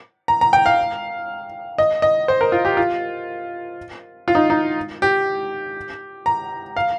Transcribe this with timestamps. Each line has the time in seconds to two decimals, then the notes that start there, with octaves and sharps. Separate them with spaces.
0.28 A#5
0.41 A#5
0.53 G5
0.66 F5
1.78 D#5
2.02 D#5
2.28 C5
2.41 A#4
2.52 F4
2.65 G4
2.77 F4
4.28 F4
4.35 D#4
4.50 D#4
5.02 G4
6.26 A#5
6.77 F5